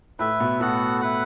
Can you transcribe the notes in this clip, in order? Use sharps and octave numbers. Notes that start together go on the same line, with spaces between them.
A2 A3 E4 B4 E5
B2 B3
A2 A3 B3 F#4 A4 F#5
E4 B4 F#5